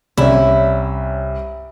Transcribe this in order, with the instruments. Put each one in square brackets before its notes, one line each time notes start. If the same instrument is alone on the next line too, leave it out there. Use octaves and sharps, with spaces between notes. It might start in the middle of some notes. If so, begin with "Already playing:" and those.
[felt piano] C2 [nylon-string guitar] C#4 C#5 D5 [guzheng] E4